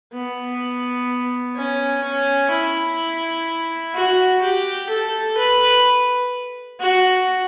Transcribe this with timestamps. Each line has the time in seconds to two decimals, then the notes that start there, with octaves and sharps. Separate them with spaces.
0.13 B3
1.56 C#4
2.03 C#4
2.51 E4
3.94 F#4
4.42 G4
4.90 A4
5.37 B4
6.80 F#4